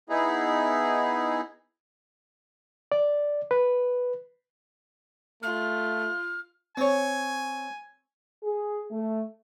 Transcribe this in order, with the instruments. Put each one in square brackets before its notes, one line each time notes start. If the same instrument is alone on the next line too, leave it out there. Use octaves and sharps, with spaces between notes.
[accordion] B3 D#4 E4 G#4
[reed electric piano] D5
B4
[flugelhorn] A3 [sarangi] F4 [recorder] F6
[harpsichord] C4 C#5 [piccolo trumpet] G#5
[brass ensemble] G#4
A3